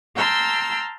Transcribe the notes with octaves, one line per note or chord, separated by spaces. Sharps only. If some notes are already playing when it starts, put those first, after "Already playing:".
G5 A5 A#5 C6 E6 F6